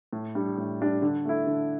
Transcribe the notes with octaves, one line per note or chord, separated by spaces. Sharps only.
A2
G3 D4
A2
G3 D4
D3
A3 E4
D3